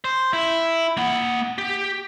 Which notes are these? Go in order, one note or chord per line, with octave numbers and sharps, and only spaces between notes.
C5
E4
A#3 F#5
G4